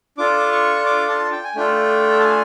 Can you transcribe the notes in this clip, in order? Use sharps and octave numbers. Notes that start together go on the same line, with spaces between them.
D4 F4 A4 D6
C#6
D6
A5
G5
G#5
A3 D4 F4 A4 G5
A5
G#5